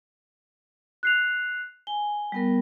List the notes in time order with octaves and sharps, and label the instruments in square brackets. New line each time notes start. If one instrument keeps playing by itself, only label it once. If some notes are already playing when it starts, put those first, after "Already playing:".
[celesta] F#6 C7 F7
[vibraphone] G#5 [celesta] G7
[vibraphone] G3 B3 A#4